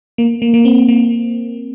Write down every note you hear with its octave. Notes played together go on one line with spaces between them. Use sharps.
A#3
A#3
A#3
C4
A#3